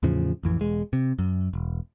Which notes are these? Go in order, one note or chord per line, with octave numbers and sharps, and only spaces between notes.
E2 A2 C#3 F3
A1 F2 E3
E1 G#3
C3
F#2
E1